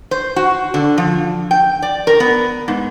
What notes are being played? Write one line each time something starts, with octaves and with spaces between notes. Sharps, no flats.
C5
F#4
D3
F3
G5
D5
A#4
B3
G#2